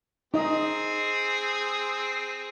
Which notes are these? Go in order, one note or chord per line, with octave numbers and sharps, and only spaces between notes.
C4 D#4 G#4 D#5